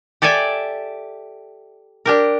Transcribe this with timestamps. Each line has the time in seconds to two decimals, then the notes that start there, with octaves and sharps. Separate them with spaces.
0.22 G4 A4 D5 E5 G#5
2.05 D4 G4 A#4